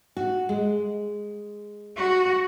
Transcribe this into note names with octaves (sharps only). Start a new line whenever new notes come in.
F#4
G#3
F#4